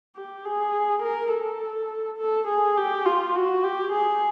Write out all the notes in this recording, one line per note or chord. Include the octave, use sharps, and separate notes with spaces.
G4
G#4
A#4
A4
A4
G#4
G4
F4
F#4
G4
G#4